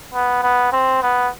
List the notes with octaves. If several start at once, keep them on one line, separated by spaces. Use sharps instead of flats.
B3
B3
C4
B3